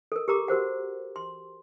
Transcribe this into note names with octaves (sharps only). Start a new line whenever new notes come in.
A4 A#4
G4 A#4 A#5 D6
F#4 A#4 C5 F#5
C6